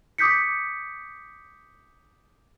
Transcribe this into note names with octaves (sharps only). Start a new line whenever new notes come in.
D6 D#6 G6 B6 C#7